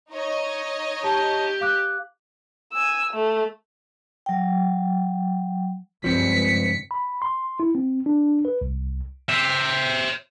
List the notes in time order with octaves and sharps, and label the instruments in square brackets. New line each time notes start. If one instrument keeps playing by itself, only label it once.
[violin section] D#4 C#5 D#5
[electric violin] G4 [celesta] A5
[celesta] F5 D6 F#6
[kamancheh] G#5 E6
A3
[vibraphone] F#3 G5
[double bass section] C#2 G2 [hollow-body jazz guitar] F3 C4 [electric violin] B6 C#7
[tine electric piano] B5
C6
E4
C4
D4
B4
C2
[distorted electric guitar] C5 E5